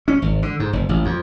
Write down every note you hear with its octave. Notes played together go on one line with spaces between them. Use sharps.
C#4
G#1
D3
G#2
F#1
A1
F2